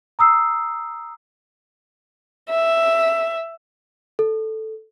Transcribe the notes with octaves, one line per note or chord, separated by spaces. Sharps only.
A#5 D#6 E6 C7
E5
A4